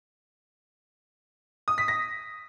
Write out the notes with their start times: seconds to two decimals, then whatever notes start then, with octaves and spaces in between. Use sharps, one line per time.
1.68 D#6
1.78 B6
1.88 A#6